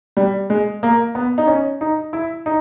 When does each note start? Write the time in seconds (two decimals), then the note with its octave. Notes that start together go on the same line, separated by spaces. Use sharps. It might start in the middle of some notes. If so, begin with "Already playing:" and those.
0.17 G3
0.50 G#3
0.83 A#3
1.15 B3
1.38 D#4
1.47 C#4
1.81 D#4
2.13 E4
2.46 D#4